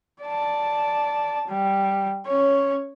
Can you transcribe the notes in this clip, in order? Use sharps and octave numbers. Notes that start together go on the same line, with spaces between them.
D5 A5
G3
C#4 C#5